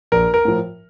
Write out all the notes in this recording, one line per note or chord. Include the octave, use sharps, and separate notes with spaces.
A#1 A#4
A#4
A2 F3